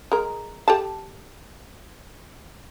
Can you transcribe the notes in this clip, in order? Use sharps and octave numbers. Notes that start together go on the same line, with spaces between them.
G#3 A#4
G4 A4 A5